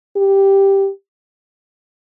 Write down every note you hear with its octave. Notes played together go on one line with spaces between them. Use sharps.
G4